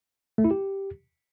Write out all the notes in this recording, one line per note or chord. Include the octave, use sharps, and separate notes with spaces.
A3
E4
G4